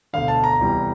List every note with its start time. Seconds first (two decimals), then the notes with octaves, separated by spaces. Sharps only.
0.13 E1 D2 D3 F5
0.28 A5
0.44 A#5
0.59 F1 E2 E3 G3